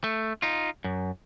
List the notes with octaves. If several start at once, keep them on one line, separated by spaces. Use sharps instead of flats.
A3
D#4 F4
F#2